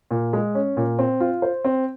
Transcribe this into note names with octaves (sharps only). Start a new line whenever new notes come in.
A#2
G#3
C#4
A#2
C4
F4
C5
C4